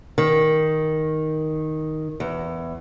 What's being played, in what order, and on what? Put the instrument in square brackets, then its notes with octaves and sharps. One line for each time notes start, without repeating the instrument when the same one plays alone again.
[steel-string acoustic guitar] D#3
E2